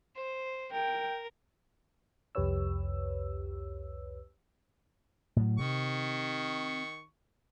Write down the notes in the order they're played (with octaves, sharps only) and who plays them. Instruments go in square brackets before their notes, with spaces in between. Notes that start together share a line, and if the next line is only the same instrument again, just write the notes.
[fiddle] C5
[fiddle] A#4 [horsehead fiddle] G5
[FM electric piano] C2 F2 G4 B4 C#5 E6
[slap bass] A2 F#3
[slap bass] C3 [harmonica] D#3 C#6